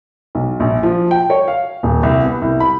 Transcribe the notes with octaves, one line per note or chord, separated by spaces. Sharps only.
B1
A#1
F3
G5
C#5
F5
D#1
C2
B3
C2
B5